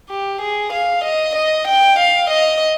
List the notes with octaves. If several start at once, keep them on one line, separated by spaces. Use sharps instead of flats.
G4
G#4
F5
D#5
D#5
G5
F5
D#5